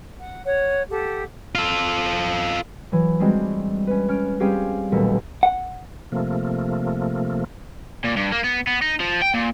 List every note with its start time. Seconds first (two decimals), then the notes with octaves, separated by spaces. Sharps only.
0.17 F#5
0.45 C#5 F#5
0.89 G4 A4 F#5
1.55 F4 A4
2.92 E3 F#3
3.20 G3 G#3 C4 D4 F#4
3.87 C#4 B4
4.08 C#4 F6 D7
4.40 G3 C4 C#4 G4 G#4 F5
4.92 D#1 B1 A3 A4 A#4 B6
5.43 F#5
6.12 C3 F3 A3 A#3
8.04 A#2
8.16 G2
8.32 A#3
8.44 B3
8.67 B3
8.82 D#4
9.00 F3
9.22 G5
9.34 A#2